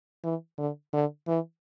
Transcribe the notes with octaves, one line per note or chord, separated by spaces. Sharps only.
E3
D3
D3
E3